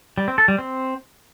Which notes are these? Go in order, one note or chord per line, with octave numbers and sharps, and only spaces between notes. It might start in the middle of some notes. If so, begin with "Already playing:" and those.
G3
C4
A4
G3
C4